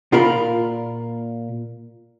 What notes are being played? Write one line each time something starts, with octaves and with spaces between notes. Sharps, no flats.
A#2 F4 A#4 B5